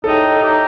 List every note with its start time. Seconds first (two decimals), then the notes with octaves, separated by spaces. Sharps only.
0.03 A2 A3 D#4 G4 A4
0.42 A2 A3 D#4 G4